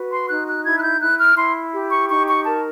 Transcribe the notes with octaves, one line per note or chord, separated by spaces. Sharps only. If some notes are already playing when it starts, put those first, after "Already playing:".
Already playing: F#4 B4
C6
D#4 F#6
F#6
E4 G#6
F#6
G6
E4 F#6
F6
E4 C6
G4
C#6
D#4 C#6
C#6
A#4 A5